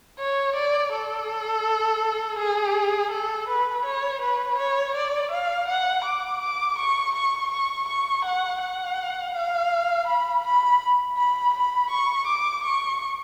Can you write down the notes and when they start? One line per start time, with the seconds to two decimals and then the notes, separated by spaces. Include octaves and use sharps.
0.19 C#5
0.56 D5
0.92 A4
2.39 G#4
3.11 A4
3.48 B4
3.85 C#5
4.22 B4
4.58 C#5
4.95 D5
5.32 F5
5.68 F#5
6.05 D6
6.42 D6
6.78 C#6
7.15 C#6
7.51 C#6
7.88 C#6
8.25 F#5
8.61 F#5
9.34 F5
10.07 B5
10.44 B5
11.17 B5
11.54 B5
11.90 C#6
12.27 D6
12.64 C#6